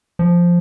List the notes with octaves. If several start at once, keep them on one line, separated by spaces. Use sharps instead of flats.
F3